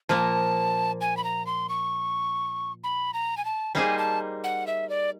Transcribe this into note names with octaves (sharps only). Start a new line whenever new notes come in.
A#2 F3 A#3 A5
G#5
B5
A#5
C6
C#6
B5
A#5
G#5
A5
G3 A#3 D#4 G#4 C5 G#5
A5
F#5
E5
D5